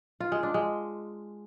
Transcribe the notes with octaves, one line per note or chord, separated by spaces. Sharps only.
F4
G#3
D4
G#3